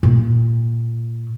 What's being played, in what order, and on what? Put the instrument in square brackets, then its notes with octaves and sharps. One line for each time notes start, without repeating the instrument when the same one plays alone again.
[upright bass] A#2